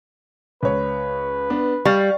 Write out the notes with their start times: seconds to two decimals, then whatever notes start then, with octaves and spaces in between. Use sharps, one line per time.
0.63 C#2 B4 C#5
1.50 B3 D4
1.85 G3 F5 C#6 A6